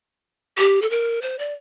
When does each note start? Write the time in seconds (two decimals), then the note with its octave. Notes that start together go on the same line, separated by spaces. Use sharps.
0.58 G4
0.82 A4
0.90 A#4
1.22 C5
1.39 D5